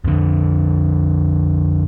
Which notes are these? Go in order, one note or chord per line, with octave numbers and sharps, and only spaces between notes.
F2 D3